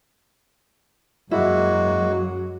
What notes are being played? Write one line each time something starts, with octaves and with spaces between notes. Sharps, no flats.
F#2 F#3 G#3 A#3 E4 F#4